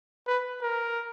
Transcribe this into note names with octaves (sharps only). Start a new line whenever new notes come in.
B4
A#4